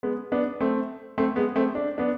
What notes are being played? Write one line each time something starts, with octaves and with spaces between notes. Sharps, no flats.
G#3 B3
B3 D4
A3 C4
A3 C4
G#3 B3
A3 C4
D4
B3 D4